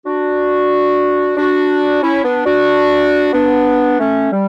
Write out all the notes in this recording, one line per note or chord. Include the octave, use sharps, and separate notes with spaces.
D4 F#4
D4 F#4
C#4 E4
B3 D4
D4 F#4
B3 D4
A3 C#4
G3